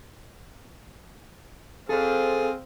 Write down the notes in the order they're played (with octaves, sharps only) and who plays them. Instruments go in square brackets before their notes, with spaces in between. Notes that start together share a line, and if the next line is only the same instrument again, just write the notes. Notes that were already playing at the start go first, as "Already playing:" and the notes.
[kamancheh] C4 F5 [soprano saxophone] G#4 [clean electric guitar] A4 C5